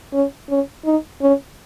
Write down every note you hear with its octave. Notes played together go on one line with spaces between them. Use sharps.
C#4
C#4
D#4
C#4